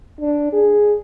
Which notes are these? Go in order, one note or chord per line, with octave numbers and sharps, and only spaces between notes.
D4
G#4